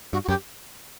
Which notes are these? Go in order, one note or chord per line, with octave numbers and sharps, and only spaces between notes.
G2 F#4
F#4
F#2 G4